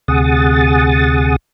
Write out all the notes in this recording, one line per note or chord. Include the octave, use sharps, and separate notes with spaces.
D2 C3 G#4 F#5 D#6 A6